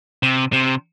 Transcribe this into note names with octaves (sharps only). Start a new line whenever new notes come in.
C3
C3